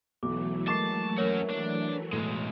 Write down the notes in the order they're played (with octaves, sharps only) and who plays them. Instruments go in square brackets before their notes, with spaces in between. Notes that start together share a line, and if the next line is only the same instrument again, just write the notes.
[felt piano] B1 [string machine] E3 F#3 A3 [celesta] D6
[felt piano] G#3 A#3 C#6 [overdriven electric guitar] A5 [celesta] D6 A6 C7
[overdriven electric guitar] C#4 F#4 [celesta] A#4 C#5
[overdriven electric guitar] D4
[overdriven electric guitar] B1 G#3 [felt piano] A2 D#7